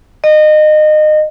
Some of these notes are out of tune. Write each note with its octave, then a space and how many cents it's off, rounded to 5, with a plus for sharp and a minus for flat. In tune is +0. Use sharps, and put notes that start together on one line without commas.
D#5 -25